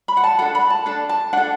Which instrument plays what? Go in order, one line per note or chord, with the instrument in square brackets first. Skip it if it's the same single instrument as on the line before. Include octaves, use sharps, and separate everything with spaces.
[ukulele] B5
F#5
A5
D4 A4 F#5
B5
A5
D4 A4
A5
D4 A4 F#5